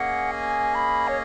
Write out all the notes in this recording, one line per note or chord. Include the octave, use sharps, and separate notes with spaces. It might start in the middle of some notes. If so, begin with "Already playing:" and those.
Already playing: A#3 C#4 G#4 D#5 F#5
G#5
B5
C#5